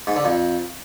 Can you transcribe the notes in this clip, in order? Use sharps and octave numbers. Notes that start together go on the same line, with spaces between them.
G#2
D3
F2